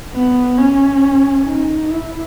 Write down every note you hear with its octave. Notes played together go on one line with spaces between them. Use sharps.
B3
C#4
D#4
E4